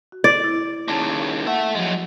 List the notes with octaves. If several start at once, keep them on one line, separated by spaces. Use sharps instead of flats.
F#4
D5
E4
D#2 C#3 A#3 A5
A4 E5 F#5
F3 F#3 G#3